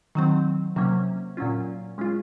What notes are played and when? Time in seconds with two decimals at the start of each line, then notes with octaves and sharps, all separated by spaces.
0.15 D#3 F#3 C4
0.76 C3 F#3 A#3 C#4
1.37 A#2 F#3 C#4 F4
1.98 G#3 C#4 F4